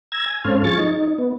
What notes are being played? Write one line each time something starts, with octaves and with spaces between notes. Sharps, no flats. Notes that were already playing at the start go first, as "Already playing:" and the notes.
A#5 E6 G#6
G#5
G#2 C4 C#4 A4 F5
F3 G#4 C#6 A6
D#4
B3